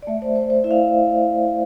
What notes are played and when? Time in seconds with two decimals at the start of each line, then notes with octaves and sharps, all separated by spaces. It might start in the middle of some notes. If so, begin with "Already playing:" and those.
0.03 D5
0.07 A3 E5
0.22 C5
0.36 A3 C5
0.50 C5
0.64 E4 E5
0.71 F5